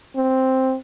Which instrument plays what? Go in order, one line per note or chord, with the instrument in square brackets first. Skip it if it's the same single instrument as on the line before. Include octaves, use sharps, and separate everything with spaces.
[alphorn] C4